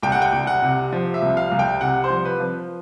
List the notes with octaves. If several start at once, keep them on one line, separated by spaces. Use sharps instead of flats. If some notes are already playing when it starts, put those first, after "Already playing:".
C2 G5
F#5
G5
C2
F#5
C3
F3
E5
C2
F5
C2
G5
C3 F#5
C5
F3
B4
F3